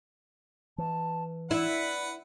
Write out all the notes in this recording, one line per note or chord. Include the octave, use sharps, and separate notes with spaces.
E3 A5
E4 B4 D5 F#5 B5